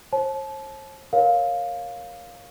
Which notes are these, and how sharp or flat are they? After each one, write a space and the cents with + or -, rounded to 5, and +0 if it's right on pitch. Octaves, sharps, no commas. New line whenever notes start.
C5 +45 A5 -30
A#4 +15 C#5 +0 F5 +10